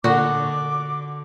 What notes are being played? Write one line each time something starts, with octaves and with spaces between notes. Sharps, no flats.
A#2 D3 F#4 D#5 D6